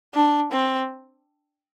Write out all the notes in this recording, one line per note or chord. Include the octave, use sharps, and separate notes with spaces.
D4
C4